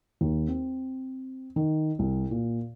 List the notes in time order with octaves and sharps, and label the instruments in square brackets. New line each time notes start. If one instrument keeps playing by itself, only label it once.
[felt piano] D#2
C4
D#3
C2
A#2